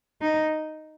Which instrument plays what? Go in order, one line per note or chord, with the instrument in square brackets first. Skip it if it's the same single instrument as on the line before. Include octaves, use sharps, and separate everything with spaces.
[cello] D#4